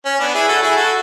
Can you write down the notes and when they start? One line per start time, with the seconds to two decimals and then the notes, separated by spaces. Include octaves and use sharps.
0.06 C#4
0.20 B3 D4
0.34 E4 G#4
0.48 F#4 A4
0.62 E4 G#4
0.76 F#4 A4